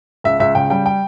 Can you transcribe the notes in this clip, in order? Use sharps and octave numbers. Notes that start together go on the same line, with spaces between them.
C#2 E5
C#2 E5
C#3 G5
G3 G5
G5